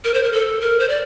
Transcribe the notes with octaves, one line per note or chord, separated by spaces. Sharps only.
A#4
C5
A#4
A4
A#4
C5
D5